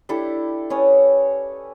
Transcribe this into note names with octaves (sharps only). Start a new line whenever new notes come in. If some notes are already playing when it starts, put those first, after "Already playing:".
D4 E4 G4 A4
C#4 B4 C#5 D#6